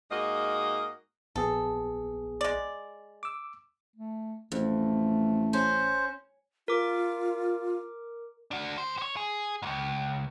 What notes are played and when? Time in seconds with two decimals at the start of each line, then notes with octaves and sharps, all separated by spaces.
0.11 G#2 A#3 F#4 D#5
1.36 A#1 B3 G#4 A4
2.41 G#3 D5
3.23 D6 E6
3.96 A3
4.52 A1 F2 A3
5.53 C#4 C5
6.68 F4 A#4 D6
8.51 D4 F#4
8.78 D2 C5
8.98 C5 C#5
9.17 G#4
9.62 C#2 G#2